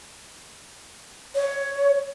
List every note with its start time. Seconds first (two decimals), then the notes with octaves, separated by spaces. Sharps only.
1.35 C#5